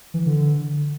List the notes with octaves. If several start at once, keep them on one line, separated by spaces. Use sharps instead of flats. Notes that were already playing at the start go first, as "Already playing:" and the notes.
E3
D3